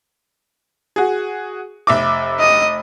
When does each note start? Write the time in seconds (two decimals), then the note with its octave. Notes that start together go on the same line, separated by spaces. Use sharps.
0.96 F#4 G#4
1.87 F1 E5 D6
2.39 D#5 D#6